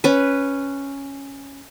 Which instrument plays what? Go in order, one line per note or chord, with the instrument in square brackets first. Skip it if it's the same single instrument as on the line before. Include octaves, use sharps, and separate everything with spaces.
[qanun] C#4 B4